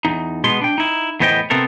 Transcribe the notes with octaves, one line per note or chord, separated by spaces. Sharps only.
E2 D#4
B2 G#3 B3 C6
D4 G5
D#4 E4
E2 A2 B3 C5 D#5 G5
C3 B3 C4 A4 A#4